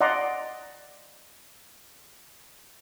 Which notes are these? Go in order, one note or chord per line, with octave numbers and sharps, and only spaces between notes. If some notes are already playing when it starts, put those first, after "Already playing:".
D5 D#5 F#5 A#5 C6